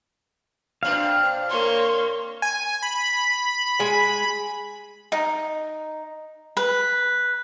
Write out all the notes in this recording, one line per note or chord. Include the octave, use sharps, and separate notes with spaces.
A#2 C4 D4 F5
A#3 C#5 C6
G#5
B5
G#3 G#5
D#4
B4